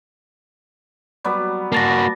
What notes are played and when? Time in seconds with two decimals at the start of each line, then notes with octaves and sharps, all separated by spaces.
1.24 F#3 G3 B3
1.72 A#3 F#4 A5 A6 A#6